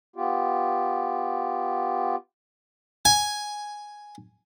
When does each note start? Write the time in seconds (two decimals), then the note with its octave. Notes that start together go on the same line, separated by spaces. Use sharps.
0.16 B3 F4 G4
3.05 G#5